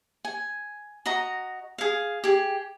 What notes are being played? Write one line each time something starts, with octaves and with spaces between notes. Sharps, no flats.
G#5
F#4 D#5 A#5
G#4 F5
G4 G#4